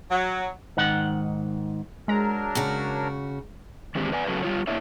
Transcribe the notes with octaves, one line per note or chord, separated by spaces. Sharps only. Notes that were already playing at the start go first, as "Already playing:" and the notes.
F#3
G#2 D#3 F#5
F#3 G#3 D4 A#4 A#5
C#3 F#4
D#3 E3 G#3 C4 D4 G4
B4 D5 G#5
C#3 F#3 C#4 F#4 A4 B4
G3 F4 C#5
A#3 D4 E4 C#5 E5